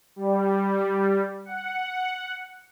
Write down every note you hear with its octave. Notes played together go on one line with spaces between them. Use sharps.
G3
F#5